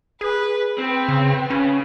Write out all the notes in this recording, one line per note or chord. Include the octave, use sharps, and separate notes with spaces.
G#4 B4
B3 C4
C#3
C#3 C#4